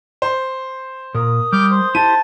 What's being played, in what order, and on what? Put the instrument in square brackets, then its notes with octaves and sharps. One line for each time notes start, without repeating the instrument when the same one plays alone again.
[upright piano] C5
[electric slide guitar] A#2 [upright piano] A#4 [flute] D#6
[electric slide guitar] G3 [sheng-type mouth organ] D6 F6 G6
[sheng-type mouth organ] C5
[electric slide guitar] E4 F4 G4 [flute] A5 [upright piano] D#7